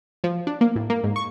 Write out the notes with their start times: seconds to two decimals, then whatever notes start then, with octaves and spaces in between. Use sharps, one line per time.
0.24 F3
0.47 D4
0.61 A#3
0.76 A2
0.90 A#3
1.04 G#2
1.16 C#6